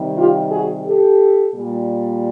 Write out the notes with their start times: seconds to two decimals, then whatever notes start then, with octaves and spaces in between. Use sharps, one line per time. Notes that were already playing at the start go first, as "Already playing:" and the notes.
Already playing: C3 D#3 G3
0.16 F4 G4
0.50 F#4 G#4
0.85 G4 A4
1.55 A#2 G3